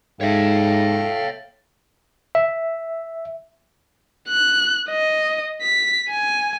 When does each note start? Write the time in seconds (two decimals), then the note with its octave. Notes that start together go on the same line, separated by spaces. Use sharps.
0.21 G#2 A4 C#5 E5 F5 G5
2.35 E5
4.29 F#6
4.90 D#5
5.62 B6
6.09 G#5